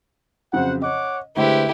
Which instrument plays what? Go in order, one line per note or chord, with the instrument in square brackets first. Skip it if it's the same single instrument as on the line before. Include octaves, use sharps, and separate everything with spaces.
[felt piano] F2 C#3 F#3 [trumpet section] C5 F#5
[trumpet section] C#5 F#5 D6 [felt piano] D#5
[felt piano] D3 G#3 A3 [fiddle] E4 G4 [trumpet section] B4 C5